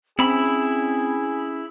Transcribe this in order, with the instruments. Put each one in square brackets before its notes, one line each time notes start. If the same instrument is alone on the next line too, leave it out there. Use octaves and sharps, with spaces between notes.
[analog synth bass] C4 [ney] C#4 [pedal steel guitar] E4 B5 [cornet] G#4